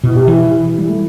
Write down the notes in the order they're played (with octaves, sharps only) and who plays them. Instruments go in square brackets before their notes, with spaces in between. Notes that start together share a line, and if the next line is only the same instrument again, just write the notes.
[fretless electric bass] B2 [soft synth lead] E4
[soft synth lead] G4
[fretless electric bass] E3 [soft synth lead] E4
[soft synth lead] G3
A3